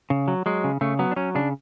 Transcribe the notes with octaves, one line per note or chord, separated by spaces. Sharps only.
C#3
F#3
F#3 G#3
C#3
C#3 A3
F#3 B3
D4
F#3 C#4
C#3 D4